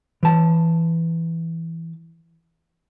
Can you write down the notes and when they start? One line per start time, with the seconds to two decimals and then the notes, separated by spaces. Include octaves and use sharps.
0.23 E3 A5